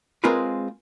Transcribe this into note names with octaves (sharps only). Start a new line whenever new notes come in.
G#3 C4 F4 G#4 A#4 B4